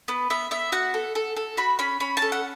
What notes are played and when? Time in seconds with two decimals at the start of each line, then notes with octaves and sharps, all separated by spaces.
0.08 B3 B4
0.30 B3 E5
0.51 B3 E5
0.72 F#4 F#5
0.94 A4
1.15 A4
1.36 A4
1.57 F#4 B5
1.79 C#4 B5
2.00 C#4 B5
2.17 A5
2.22 A4
2.32 F#5